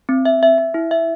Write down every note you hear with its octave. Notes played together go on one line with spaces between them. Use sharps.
C4
E5
E5
E5
E4
E5